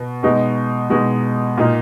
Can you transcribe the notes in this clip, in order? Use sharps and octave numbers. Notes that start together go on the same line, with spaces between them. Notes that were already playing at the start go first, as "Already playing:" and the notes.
Already playing: B2
B2 G#3 D#4
B2 G#3 D#4
A#2 A#3 D#4